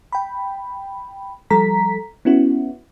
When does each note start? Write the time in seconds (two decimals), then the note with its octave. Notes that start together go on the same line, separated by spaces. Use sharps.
0.12 G5 B5
1.50 F3 G3 A4 A#5 B6
2.25 B3 C#4 E4 F#4